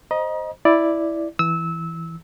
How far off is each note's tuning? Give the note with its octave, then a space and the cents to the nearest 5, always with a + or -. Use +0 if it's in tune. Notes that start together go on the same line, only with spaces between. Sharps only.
C5 +5 D#5 +0 A#5 +40
E4 +0 D5 +0
E3 +0 E6 -20